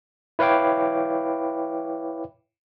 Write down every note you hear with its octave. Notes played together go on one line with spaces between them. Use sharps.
E4 B4 C#5 F5 G5 D6